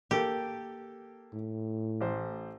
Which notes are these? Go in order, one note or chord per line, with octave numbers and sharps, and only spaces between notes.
A#3 G4 A4
A2
A1 C5